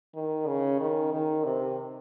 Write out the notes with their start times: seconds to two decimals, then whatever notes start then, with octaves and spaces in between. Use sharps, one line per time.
0.15 D#3
0.47 C#3
0.80 D#3
1.13 D#3
1.45 C3